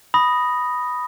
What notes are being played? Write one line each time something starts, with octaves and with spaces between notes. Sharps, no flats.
B5 D#6 A#6